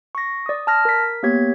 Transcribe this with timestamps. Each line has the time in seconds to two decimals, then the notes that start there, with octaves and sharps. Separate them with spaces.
0.15 C#6 A#6
0.46 D5 D#6
0.67 A5 F6 A#6
0.85 A#4 B6
1.23 A#3 B3 G4 C#5 G#6 B6